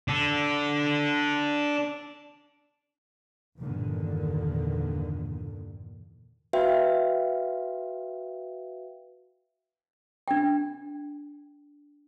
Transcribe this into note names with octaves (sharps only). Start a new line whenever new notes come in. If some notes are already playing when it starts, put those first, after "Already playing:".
D4 A4
E2 G2 A#2 D3 D#3
F#4 B4 E5 F5 G5
D4 G5